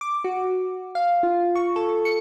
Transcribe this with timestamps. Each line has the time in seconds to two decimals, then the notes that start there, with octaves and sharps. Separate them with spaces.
0.01 D6
0.24 F#4
0.95 F5
1.23 F4
1.55 C#6
1.76 A4
2.05 C#7